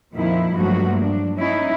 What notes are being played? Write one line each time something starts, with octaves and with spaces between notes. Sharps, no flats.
F2 A#2 D#3 F3 E4
G2 F3 F#3 A3 A#3 F#4
D4
C#4 D#4 E4